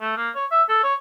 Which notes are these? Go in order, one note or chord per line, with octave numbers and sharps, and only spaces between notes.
A3
A#3
C#5
E5
A4
C#5